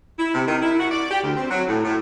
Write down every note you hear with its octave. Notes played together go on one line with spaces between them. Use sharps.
E4
C3
D#3
E4
F#4
D5
G4
D2
C4
F#3
A2
A2